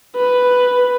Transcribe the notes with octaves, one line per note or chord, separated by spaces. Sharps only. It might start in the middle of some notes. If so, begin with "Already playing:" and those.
B4